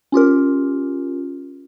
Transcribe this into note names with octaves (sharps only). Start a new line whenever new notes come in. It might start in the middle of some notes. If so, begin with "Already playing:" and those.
C#4 F4 G4 A#4